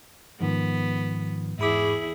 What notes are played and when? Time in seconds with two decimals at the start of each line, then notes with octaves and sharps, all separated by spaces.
0.41 G#2 D#3 F3 B3
1.59 E2 G#2 E4 G#4 B5 D6